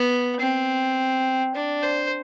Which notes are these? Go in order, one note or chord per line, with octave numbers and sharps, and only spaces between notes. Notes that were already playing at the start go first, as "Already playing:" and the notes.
Already playing: B3
C4
D4
C5